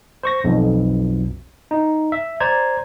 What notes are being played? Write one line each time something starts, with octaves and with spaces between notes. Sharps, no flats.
C5 C#6 A#6
B1 F2
D#4
E5
C5 D5 A#5 G#6